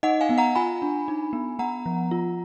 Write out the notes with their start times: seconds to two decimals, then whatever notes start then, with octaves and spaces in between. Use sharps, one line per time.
0.03 D#4 D#5 F#5
0.21 F5 G#5
0.29 B3
0.38 F#5 A#5
0.55 F4 G#5 B5
0.82 D4
1.08 D#4
1.33 B3
1.59 B3 F#5 A#5
1.86 F3
2.11 F4